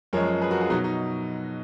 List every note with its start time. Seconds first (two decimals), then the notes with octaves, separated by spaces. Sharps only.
0.13 F#2 F3 G#3 A#4 C#5
0.41 G#4 B4
0.51 F#4 A#4
0.61 F4 G#4
0.70 B2 F#3 D#4 F#4
0.84 D#4